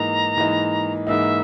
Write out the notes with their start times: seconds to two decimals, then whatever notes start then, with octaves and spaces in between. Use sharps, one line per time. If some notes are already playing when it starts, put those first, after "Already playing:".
Already playing: G#2 E3 A#3 D#4 A#5
0.37 G#2 E3 A#3 D#4
1.07 G#2 E3 A#3 D#4 E5